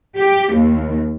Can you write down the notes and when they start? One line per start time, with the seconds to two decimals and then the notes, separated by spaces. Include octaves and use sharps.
0.17 G4
0.53 D#2